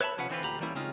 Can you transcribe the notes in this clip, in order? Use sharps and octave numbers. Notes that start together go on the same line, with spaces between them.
B4 C#5 E5 F5 A5 B5
B1 C3 F3 C#4 B4 F#5
D3 E3 C4 D4 F4 B4
D2 A#2 G4 A#5 B5
E3 G3 A#3 C#4 E4
C#3 G#3 C4 C#4 D#4 F4